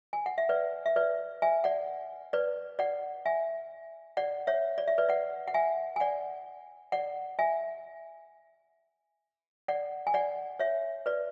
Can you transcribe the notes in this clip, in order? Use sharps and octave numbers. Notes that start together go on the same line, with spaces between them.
G#5
F#5
E5
B4 D5
E5
B4 D5
E5 G#5
D5 F#5
B4 D5
D5 F#5
E5 G#5
D5 F#5
C#5 E5
D5
E5
B4 D5
D5 F#5
F#5
E5 G#5
G#5
D5 F#5
D5 F#5
E5 G#5
D5 F#5
G#5
D5 F#5
C#5 E5
B4 D5